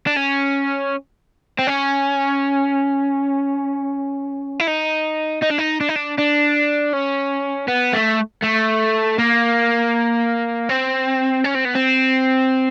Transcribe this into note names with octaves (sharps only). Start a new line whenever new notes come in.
D4
C#4
C4
C#4
E4
D#4
D#4
D4
D#4
D4
D#4
D4
D4
C#4
B3
A3
A3
A#3
C4
C#4
C4
B3
C4